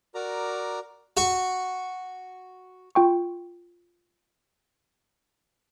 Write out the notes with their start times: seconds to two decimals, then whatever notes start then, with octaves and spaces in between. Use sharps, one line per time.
0.15 F#4 A#4 D5 A#5 D6
1.17 F#4 C#6
2.95 F4 G5 C#6